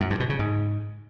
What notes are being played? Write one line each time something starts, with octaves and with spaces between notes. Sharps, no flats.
F#2
G2
B2
C#3
G#2